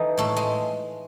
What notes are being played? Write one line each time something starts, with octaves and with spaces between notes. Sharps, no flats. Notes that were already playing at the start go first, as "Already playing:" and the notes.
Already playing: E3 D#4 A4
A2 A3
G#3